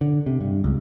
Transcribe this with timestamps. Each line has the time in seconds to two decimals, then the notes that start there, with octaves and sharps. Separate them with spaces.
0.01 D3
0.26 C3
0.41 G2
0.64 C#2